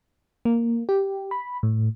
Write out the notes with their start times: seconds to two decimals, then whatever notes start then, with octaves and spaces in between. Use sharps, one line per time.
0.45 A#3
0.89 G4
1.31 B5
1.63 A2